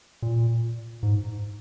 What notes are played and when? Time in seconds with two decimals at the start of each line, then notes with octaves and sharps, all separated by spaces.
0.22 A#2
1.03 G#2